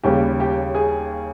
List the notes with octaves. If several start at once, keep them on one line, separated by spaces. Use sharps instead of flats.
D#2 C#3 G3 G4
G4
G#4